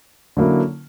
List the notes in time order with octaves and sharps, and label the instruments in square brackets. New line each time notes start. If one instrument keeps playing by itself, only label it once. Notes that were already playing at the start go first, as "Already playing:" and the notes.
[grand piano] D3 F#3 A#3 C#4 E4